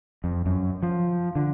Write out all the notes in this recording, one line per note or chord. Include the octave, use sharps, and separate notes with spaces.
F2
F#2
F3
D3